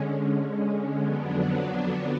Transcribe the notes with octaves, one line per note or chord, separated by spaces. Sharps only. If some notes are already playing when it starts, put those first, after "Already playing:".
Already playing: D3 G#3 C#4
F2 D3 F#3 B3 D4